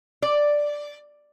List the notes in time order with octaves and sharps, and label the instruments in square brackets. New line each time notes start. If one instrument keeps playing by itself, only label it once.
[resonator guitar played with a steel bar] D5